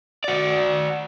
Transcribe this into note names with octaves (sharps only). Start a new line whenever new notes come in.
F#4 D5